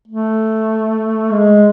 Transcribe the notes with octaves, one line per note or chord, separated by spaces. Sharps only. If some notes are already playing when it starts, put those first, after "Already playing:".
A3
G#3